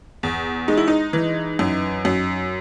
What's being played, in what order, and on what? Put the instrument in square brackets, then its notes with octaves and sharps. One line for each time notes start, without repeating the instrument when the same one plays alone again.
[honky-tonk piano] E2
G#3 D#4
E4
D#4
E3
F#2
F#2